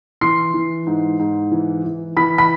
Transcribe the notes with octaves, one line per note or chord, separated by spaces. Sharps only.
E3 C6 C7
E3
G#2
G#2
E3
E3
E3 B5 B6
B5 B6